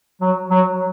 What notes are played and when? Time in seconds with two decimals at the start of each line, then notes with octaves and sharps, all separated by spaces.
0.21 F#3
0.51 F#3